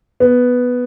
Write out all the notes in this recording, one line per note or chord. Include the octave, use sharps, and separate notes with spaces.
B3